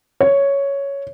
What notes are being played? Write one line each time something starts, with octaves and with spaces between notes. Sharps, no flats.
C#5